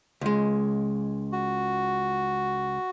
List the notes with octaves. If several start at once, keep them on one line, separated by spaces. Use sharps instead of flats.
C#2 G#3
F#4